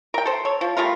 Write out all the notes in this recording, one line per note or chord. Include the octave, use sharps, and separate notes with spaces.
A#4 G5
A4 C5
A4 C#5
F3
G3 A3 F4 A#4